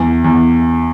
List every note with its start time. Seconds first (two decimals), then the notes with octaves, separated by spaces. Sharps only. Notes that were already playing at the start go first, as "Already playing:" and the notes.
Already playing: E2
0.24 E2